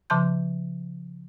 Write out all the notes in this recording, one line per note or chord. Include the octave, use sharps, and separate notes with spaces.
C#3 F3 A5 C6 G6